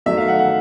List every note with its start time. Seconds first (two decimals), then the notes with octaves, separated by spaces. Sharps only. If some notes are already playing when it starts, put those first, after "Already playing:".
0.06 F#2 D#3 F#3 A3 E5
0.17 F5
0.28 F#5
0.39 F#5